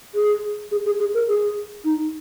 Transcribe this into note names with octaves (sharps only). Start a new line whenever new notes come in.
G#4
G#4
G#4
G#4
A#4
G#4
D#4